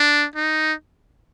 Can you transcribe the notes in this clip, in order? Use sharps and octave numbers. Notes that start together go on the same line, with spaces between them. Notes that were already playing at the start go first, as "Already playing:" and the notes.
Already playing: D4
D#4